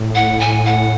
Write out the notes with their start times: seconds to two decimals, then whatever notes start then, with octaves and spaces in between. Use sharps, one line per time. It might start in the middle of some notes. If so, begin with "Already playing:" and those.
Already playing: A2
0.15 F#5
0.40 G#5
0.66 F#5